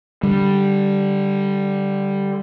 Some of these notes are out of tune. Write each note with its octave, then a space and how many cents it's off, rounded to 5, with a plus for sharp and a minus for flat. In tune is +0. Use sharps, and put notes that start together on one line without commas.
D3 +0 G3 +0